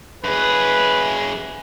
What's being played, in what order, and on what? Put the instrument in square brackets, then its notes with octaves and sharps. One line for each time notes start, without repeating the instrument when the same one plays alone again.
[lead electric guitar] F#2 G#4 [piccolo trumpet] B4